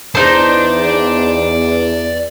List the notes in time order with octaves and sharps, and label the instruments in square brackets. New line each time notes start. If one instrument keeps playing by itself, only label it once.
[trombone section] E2 [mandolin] D#4 C5 [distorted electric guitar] D5 A5